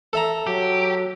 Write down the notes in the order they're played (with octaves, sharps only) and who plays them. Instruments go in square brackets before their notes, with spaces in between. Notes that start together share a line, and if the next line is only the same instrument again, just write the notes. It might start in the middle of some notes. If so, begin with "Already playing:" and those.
[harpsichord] A4 E5 A#5
[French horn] F#3 [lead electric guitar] G4